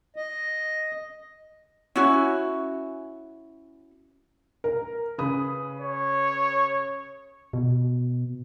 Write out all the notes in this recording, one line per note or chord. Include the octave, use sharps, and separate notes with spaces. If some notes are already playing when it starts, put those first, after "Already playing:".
D#5
C#4 E4 F#4
A#4
C#3 B4 D#6
C#5
B2